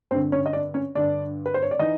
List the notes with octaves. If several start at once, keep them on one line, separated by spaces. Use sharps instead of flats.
G2 D3 C4 C5
C#4 C#5
D#5
D4 D5
C#4 C#5
G2 D3 D4 D5
B4
C5
C#5
D5
E3 D#4 D#5